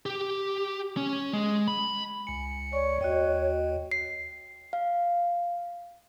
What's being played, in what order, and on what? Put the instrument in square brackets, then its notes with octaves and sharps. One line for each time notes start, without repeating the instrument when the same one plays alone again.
[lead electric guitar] G4
C#4
G#3
B5
[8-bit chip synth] C#2 C#7 [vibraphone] G#5
[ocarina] C#5 [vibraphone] D5 C#6
[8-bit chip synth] D#2 [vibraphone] F#4 D#5 G5
[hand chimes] C7
F5